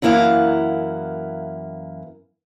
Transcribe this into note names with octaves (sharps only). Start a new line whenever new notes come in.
F#2 E3 A#3 E4 F5 F#5